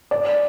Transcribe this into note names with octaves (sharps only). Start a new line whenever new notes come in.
D5